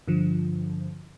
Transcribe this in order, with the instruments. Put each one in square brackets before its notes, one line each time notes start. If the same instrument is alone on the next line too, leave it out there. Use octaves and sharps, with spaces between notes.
[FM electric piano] G2 D3 F3